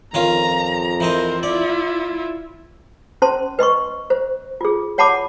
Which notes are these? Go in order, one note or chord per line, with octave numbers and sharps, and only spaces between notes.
F2 D#3 C#4 F4 A#5
E3 C4 A#4 C5 D#5
E4 F4 D5
C#4 C5 A5 C6
B4 D#5 C6 C#6
C5
F4 G#4
C#5 F#5 A5 B5 D6